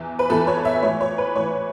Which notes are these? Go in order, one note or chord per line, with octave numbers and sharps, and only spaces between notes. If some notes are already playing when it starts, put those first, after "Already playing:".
Already playing: E2 E3
B4
E2 E3 A4
C#5
E5
A2 E3 C#5
C#5
B4
A2 E3 C#5